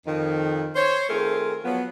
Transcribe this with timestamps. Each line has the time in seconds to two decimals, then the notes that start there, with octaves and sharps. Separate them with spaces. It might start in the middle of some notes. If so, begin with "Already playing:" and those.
0.06 F2 D#3
0.76 C5 C#5
1.09 D#3 A3 C4 F4 G#4 A#4
1.64 F3 F#3 B3